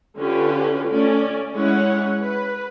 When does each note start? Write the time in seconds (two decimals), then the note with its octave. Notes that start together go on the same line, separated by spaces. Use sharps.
0.18 D3 C#4 F4 G4 B4
0.88 A3 C#4 D5
1.55 G#3 C#4 E4 C#5 F#5
2.22 B4